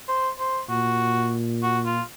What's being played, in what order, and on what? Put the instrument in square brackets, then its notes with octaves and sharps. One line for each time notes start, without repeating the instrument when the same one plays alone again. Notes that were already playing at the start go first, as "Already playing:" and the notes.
[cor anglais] C5
C5
[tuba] A#2 [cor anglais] F#4
[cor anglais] F#4
F4